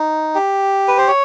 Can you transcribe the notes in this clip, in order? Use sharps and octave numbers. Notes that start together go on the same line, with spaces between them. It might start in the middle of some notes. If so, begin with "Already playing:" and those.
Already playing: D#4
G4
B4
C5
C#5